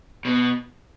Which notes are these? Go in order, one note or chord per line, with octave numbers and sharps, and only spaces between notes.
B2